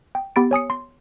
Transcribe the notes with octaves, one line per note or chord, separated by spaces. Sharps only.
G5
B3 G4 B5 A6 D7
C#5 G#5 D#6 C#7
C6